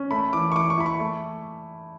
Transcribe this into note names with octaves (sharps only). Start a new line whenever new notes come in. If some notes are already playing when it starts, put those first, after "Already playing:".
Already playing: C#4
A3 B5
E3 D6
C#6
E3 D6
C#6
E4 B5
C#6
A3